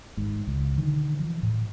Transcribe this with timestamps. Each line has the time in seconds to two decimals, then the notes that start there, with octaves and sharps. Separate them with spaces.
0.17 G#1 G#2
0.47 C#2
0.77 B2 D3 D#3
1.19 E3 F3
1.43 A2